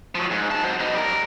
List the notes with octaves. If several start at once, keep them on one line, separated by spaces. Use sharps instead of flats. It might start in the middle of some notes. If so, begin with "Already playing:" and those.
F3 F#3
G#2
G#3 A5
F#3 C5
B2 D#4
G3 A#4